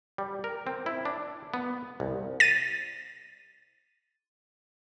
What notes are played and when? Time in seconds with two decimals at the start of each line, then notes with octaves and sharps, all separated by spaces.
0.18 G3
0.44 A#4
0.67 C4
0.86 E4
1.05 D4
1.54 B3
2.00 C2
2.40 A6 D#7